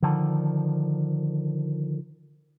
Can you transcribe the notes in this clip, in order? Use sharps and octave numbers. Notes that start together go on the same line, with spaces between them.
D3 D#3 F3